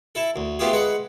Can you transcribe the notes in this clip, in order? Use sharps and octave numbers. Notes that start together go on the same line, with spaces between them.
E4 A4
D2
A3 B3 F4 G4 G#4
G#3 B4 F#5